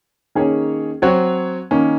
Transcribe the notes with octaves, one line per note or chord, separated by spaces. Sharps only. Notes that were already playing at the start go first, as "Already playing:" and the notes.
D#3 A#3 C#4 G#4 C#5
F#3 C4 F#4 C#5
D#3 A#3 C#4